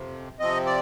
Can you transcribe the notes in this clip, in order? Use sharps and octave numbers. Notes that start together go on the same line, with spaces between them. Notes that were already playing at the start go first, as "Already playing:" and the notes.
Already playing: F2 C3 F3
C3 F3 C4 D#5
D5